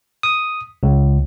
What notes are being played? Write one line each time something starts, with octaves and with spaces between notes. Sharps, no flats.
D#6
C#2